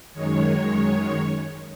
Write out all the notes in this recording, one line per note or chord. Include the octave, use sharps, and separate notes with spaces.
F#2 D#3 G#3 C#5